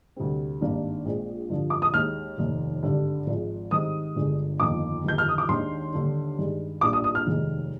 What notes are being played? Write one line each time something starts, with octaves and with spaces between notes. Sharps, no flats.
D2 C3 G3 C4
G#1 G2 D#3 A#3 D4
A#1 A#2 G#3 C4
G2 D3 F3
D6
D#6
D#2 D#3 G#3 F6
F1 D#2 D#3
G#1 G2 D3 G3
G#1 G#2 F3 G#3
G#2 D#3 G3 C4 D#6
G1 G2 D3 G#3
G1 F2 D#3 A#3 D6
G1 F2 D#3 G3 G6
F6
D#6
D6
D#2 D#3 G#3 D4 C6
D#2 D3 G3 D4
G2 D#3 G#3
A#1 A#2 G3 A#3 D4 D6
D#6
D#6
F6
F1 D#2 D#3 G#3